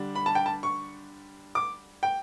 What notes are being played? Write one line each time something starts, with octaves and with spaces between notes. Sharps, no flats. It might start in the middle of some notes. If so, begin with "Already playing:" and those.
Already playing: D3 G3 D4
B5
A5
G5
A5
C#6
D6
G5